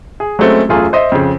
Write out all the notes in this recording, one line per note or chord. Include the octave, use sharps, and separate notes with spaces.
G#4
F#3 G#3 A3 C4 C#4
E1 F#2 A3 F4 G#4
C5 D#5 E5
F2 C#3